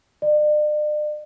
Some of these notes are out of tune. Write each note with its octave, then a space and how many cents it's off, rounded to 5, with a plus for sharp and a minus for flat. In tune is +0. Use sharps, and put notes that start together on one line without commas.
D5 +40